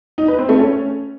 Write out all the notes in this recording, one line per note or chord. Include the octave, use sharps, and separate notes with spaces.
D#4
B4
C4
A3
C#4